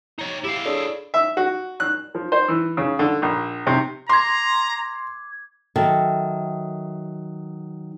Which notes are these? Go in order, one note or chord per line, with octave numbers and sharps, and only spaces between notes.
D#4 C#5
E4 G4 F5
D4 G#4 A4 C#5
E5
F#4
F#6
F3
C5
E3
C#3
D3
A#1
C3
A#5 C6 D6 G#6
D#3 F#3 A4 E5